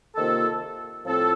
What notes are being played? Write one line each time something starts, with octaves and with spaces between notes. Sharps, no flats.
C3 D#3 A#3 F4 A4
A2 F3 C4 F4 A4